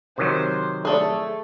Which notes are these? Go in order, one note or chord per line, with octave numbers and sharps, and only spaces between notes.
C3 D#3 F#3 C5
A3 G#4 A4 D5